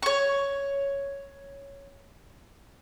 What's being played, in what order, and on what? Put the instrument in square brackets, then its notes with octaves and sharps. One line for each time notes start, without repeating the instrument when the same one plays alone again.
[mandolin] C#5 C#6